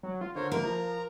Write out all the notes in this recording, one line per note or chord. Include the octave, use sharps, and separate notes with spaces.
F#3
F4
D3 A#4 C5 C#5
A#3 E4 A#4
F3 A#5